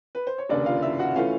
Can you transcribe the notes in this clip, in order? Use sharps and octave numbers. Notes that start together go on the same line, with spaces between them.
B4
C5
C#5
F1 D#2 C#3 D4 D5
F4 F5
E4 E5
F#4 F#5
E3 A3 C#4 F4 F5